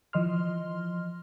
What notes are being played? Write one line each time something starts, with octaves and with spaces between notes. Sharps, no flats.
E3 F3 D#5 C6 F6